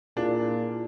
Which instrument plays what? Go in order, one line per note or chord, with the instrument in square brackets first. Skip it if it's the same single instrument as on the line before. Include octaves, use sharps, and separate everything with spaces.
[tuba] A#2 [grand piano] D4 [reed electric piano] E4 F4 G#4